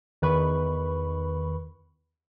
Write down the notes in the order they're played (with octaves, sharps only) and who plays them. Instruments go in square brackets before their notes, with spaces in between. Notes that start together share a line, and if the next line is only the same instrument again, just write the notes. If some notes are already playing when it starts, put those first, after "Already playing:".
[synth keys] E2 D#3 B4 B5 C#6